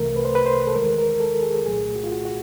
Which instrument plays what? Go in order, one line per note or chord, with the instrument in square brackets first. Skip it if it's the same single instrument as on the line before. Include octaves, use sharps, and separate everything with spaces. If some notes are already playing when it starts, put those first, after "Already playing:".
Already playing: [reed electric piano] C2 C3 E3 A3 A#4
B4
C5
B4
C5
A4
D#2 D#3 G#3 A#4
A#4
A4
G#4
C2 A#2 F#3 A3 G#4
F#4
F4
F#4
F#4